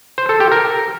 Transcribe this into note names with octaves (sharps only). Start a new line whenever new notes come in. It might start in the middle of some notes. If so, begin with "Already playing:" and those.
C5
A4
G4
A#4